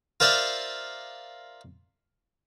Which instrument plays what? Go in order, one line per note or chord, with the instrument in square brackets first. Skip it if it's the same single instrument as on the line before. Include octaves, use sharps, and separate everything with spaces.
[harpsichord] F4 A#4 C5 D5 E5